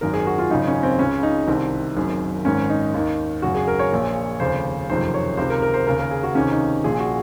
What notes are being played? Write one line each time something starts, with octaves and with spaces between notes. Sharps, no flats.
G#1 F#2 D#3 A#4
G#4
F#4
F4
G#1 F#2 C#3 D#4
C#4
C4
C#2 C#3 C#4
D#4
C2 C3 D#3 C4
F#1 F#2 D#3
G#1 G#2 D#3 C#4
D#4
D#2 D#3
G#1 F#2 C#3 F#4
G#4
A#4
C#5
A#1 A#2
F1 D#2 C#3 C5
F#1 F2 C3 D#3 C5
C#5
C#2 C3 D#3 C5
A#4
A#4
C5
D#2 C#3 A#4
A#4
G#4
F#4
C#2 C3 D#3 C#4
D#4
A#1 A#2 G#4
F#4